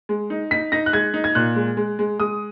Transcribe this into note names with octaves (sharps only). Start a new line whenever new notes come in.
G#3
D#4
D#4 B6
D#4 A#6
F#6
G#3 G#6
D#4
G#6
A#2 F#6
G#3
G#3
G#3
G#3 D#6